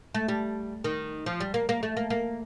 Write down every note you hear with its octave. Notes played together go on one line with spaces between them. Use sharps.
A3
G3
D#3
F3
G3
A#3
A#3
A3
A#3
A#3